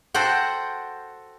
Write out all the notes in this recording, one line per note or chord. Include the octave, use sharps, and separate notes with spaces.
F#4 A4 C5 F#5 G5